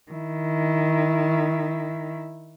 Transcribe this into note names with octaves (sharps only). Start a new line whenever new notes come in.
D#3 E4